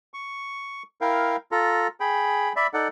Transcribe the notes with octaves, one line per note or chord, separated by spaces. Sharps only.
C#6
E4 A#4 F5 G5
F4 A4 A#5
G#4 G5 B5
D5 E5 B5
D#4 A4 D5 F#5